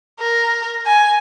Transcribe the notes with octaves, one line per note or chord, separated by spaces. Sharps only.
A#4
G#5